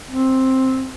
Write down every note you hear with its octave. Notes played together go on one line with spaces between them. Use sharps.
C4